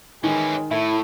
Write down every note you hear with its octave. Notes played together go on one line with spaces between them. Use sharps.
D#3 E3 G#3 C#4
A2 A3 E4